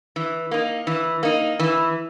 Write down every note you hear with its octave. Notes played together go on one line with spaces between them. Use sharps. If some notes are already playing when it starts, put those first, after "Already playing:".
E3
A#3 D#4
E3
A#3 D#4
E3